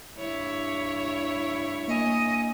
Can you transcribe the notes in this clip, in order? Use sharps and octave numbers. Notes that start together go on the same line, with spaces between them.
G2 E4 C#5
A#3 D#5 G#5